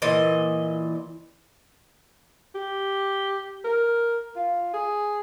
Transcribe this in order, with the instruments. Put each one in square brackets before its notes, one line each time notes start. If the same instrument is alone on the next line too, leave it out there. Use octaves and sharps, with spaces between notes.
[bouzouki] A#2 E3 D#5
[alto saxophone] G4
A#4
F4
G#4